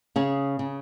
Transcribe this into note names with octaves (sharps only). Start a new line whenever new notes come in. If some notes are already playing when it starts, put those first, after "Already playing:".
C#3 G#4
C#3